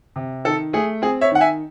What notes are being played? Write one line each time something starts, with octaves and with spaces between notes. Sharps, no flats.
C3
D#3 A4
A3 G#4
C4 G#4
C#5 E5
D#3 F#5
E5 G#5